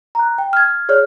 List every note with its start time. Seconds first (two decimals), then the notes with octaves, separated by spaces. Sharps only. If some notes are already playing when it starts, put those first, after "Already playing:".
0.15 A#5 F#6
0.38 G5
0.53 F6 G#6
0.89 G#4 C#5 D5 F6